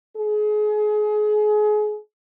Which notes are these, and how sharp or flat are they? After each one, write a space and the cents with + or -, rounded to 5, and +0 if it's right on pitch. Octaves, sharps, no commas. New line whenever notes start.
G#4 +30